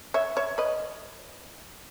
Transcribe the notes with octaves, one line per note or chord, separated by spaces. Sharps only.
C#5 E5
C#5 E5
B4 D#5